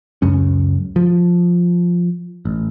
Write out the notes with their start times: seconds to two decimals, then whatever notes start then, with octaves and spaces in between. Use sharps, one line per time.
0.22 C#2 F#2 C#4
0.96 F3
2.45 A1